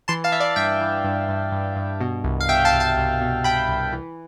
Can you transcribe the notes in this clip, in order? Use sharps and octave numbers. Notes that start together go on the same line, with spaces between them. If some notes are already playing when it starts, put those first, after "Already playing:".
E3 A5 C6
F5 A5
E3 E5
D5 F5
G2 E5 G5
E3
G2
G2
G2
G2
B2
C2
F5
B2 E5 G5
F5 A5
C2
F5 A5
C2
B2
B2 G5 B5
C2
E3